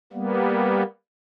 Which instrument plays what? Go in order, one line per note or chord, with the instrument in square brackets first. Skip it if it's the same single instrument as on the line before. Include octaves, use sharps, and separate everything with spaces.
[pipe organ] G3 A#3 B3